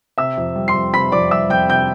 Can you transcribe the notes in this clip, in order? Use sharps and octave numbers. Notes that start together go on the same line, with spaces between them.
C3 E5 E6
F2
G3
C6 C7
F2
C3 B5 B6
F2 D5 D6
G3 E5 E6
F2 G5 G6
C3 G5 G6